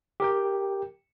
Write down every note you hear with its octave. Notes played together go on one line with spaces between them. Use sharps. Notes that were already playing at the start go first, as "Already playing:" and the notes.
G4 A#4 G5